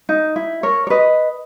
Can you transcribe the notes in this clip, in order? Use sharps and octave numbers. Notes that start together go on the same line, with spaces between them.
D#4
E4
A#4 C#5
C#5
B4 D#5